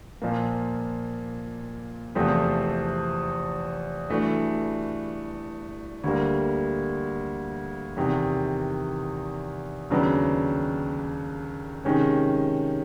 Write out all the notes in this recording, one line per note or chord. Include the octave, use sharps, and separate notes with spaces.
A#2 F3 A#3
E2 C3 F3 A3 C4
G2 E3 A3 D4 F#4
D2 D3 G3 A#3
E2 C3 D#3
D#2 C#3 F#3 B3 D4
C3 D#3 G#3 C#4